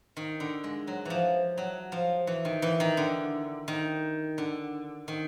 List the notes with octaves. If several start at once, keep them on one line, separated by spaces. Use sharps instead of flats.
D#3
D3
G#3
F#3
E3 F3
F#3
F3
E3
D#3
E3
D#3
D3
D#3
D3
D#3